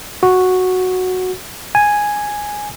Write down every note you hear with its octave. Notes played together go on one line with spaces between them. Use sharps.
F#4
G#5